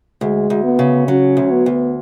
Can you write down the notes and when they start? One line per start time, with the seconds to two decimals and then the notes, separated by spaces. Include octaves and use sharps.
0.21 D2 G#3
0.50 D2
0.64 B3
0.79 C#3
1.08 F#3 C#4
1.37 D2
1.51 B3
1.66 D2